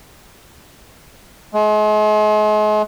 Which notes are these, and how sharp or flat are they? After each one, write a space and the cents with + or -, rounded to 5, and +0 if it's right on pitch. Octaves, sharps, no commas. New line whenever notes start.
G#3 +40